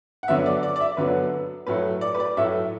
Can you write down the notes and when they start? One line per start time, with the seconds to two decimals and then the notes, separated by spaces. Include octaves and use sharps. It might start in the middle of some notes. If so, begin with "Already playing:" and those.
0.23 F#5
0.28 D3 F#3 B3 E5
0.46 D5
0.63 D5
0.76 D5
0.80 E5
0.97 D3 F#3 B3 B4
1.67 A2 F#3 A3 B4
2.01 D5
2.15 B4
2.20 D5
2.37 A2 F#3 A3 E5